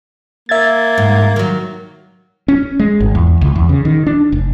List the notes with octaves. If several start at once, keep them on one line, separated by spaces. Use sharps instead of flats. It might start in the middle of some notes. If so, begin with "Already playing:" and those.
A#3 E5 G#6 A6
G#2
D#3 F#3
C#4
G#3
G#1
E2
C#2
E2
C#3
D#3
D4
F1